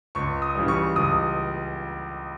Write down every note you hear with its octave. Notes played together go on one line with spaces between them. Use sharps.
C#2 C#6
D#6
C#3 E3 G3
C#6
C#2 D#6